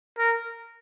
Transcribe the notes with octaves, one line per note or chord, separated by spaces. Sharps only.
A#4